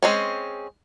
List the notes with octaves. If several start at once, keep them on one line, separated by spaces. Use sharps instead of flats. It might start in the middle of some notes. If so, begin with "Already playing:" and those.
G#3 C4 C#4